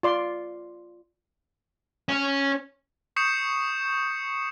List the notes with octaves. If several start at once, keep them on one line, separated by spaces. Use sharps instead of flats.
F4 D5 C6
C#4
C#6 D#6 G6 C7 C#7 E7